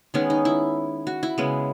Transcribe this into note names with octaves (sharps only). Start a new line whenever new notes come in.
D#3 G#3 B3 C#4
D#4
E4
F#4
E4
C#3 G#3 B3